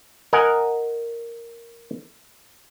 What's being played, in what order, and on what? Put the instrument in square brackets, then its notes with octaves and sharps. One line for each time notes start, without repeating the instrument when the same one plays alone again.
[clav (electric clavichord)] A#4 D#5 F#5 G#5